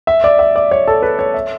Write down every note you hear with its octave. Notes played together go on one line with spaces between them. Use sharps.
E5
D5
E5
D5
C#5
A4
B4
C#5
E5